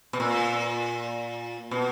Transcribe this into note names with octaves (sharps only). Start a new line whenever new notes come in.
B2
A#2
B2